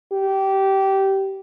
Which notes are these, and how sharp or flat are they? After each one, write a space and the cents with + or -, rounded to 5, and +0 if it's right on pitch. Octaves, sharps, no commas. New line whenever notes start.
G4 -20